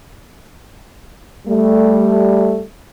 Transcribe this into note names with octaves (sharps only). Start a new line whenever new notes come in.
G3 A3